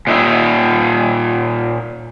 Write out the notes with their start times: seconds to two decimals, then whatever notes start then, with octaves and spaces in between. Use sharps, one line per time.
0.07 A#2 D#4 E5